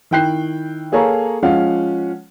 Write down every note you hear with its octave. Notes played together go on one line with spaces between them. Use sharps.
D#3 E4 G5 F#6 C7
A#3 G#4 A4 C#5 F5 A#5
F3 G#3 C#4 F5 F#5